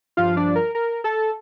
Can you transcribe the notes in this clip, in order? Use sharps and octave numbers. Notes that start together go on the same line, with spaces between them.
G2 F3 F4 F5
D4 D5
A#4
A#4
A4 A5